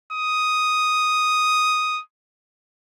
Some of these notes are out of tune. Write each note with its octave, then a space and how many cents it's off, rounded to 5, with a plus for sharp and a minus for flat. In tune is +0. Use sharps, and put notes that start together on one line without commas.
D#6 +0